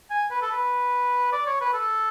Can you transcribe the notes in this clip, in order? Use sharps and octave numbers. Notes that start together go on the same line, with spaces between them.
G#5
B4
A4
B4
D5
C#5
B4
A4